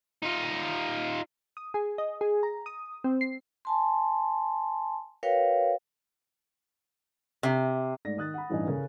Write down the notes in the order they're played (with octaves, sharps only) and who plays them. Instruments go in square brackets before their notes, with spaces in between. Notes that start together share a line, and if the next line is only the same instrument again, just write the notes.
[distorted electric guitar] D#4 F4
[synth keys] D#6
G#4
D#5
G#4
A#5
D#6
C4
C7
[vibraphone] G#5 A5 C6
F#4 A#4 B4 C#5 F5 G5
[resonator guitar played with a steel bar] C3
[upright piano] G#2 A3 D5 A#6
D#3 D#6 F#6 A6
F#5 B5
A1 G2 E3 D#4 G#5
C#3 C#4 A4 A#4 C#5